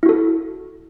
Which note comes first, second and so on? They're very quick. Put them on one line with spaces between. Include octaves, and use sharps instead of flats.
E4 F#4 A4